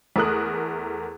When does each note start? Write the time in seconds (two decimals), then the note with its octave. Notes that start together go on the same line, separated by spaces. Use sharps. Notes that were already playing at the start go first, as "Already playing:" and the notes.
0.16 E2 A3 A#4 D#6 F#6